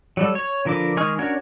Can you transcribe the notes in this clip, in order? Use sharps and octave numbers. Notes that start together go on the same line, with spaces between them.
F#3 G3 A4
C#5
D3 F3 A#4 B4 D6
D#3 G#3 G#4 C#6 F6
C#4 D4 F#4 A#4 C#5